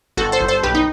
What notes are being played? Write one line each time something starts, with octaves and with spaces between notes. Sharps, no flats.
G1 F#4 A4
A4 C5
G1
A4 C5
B1 G4 B4
D#4